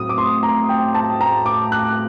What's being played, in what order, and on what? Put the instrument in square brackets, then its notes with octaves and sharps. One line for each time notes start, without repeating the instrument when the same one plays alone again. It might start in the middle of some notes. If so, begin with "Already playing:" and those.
Already playing: [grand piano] A2 F#3 C4 D#6
D6
C6
A#5
G5
A5
A#5
D6
F#6